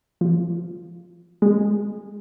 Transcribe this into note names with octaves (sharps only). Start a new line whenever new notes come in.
F3
G#3